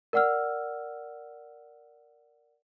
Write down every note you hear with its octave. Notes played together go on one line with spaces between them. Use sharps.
A#4 D5 F#5 E6 F6